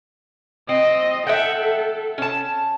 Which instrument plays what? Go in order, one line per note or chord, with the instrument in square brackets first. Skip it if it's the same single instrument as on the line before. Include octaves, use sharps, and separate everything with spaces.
[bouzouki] C4 [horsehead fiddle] D#5
[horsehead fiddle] A4 [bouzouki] E5 F#5 G5
[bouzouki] C#4 A5